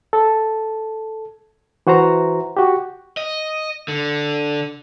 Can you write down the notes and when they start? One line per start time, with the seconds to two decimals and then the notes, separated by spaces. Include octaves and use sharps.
0.13 A4
1.87 E3 F#4 C5 A#5
2.57 F#4 G4
3.17 D#5
3.88 D3